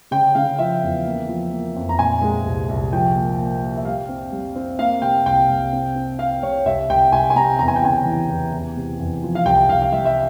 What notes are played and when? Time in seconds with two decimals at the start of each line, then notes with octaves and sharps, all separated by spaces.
0.11 C#3 G5
0.35 C#3 F5
0.59 F3 E5
0.83 E2
1.05 A#3
1.29 F3
1.51 A#3
1.76 F2
1.89 A#5
1.99 A#2 G#5
2.21 G#3
2.45 C2
2.69 C2
2.92 F3 G5
3.15 A#3
3.39 A#3
3.62 A#3
3.77 E5
3.85 G3 F5
4.09 C4
4.32 G3
4.55 C4
4.79 A#3 F5
5.02 C3 G5
5.26 C2 G5
5.49 C2
5.72 C4
5.95 C4
6.19 C4 F5
6.43 C3 C#5
6.66 C2 E5
6.90 C2 G5
7.12 C2 G#5
7.30 G#5
7.36 C3 A#5
7.59 E2 A#5
7.68 G#5
7.76 G5
7.82 C#3 G#5
8.06 E3
8.29 E2
8.52 E2
8.77 C3
8.99 E2
9.23 F3
9.35 F5
9.46 C2 G5
9.69 C2 F5
9.82 F5
9.92 G3 E5
10.05 E5